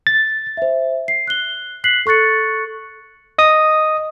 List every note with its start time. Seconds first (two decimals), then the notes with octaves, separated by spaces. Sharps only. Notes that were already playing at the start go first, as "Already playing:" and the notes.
0.07 A6
0.57 C5 E5
1.08 C7
1.27 F#6 G7
1.84 F#6 B6 C7 F#7
2.06 A4 C#6 F#6 A6 C#7
3.38 D#5 D#6